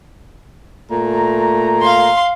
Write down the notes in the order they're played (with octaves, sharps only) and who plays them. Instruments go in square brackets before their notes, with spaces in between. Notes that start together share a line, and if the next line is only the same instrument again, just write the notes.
[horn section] A#2 A3 A#5
[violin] F5 C6